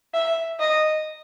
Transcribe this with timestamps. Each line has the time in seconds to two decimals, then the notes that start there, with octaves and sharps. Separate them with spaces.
0.14 E5
0.60 D#5